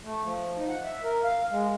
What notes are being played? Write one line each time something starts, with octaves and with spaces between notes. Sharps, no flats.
A3
F3
D#4
F#5
E5
A#4
F5
G#3